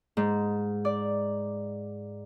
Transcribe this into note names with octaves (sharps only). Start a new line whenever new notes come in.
G#2
D5